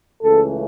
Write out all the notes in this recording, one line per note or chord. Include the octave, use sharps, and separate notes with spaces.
C#2 C#3 E3 A3 A4